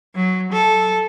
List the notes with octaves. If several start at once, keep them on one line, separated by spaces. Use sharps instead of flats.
F#3
A4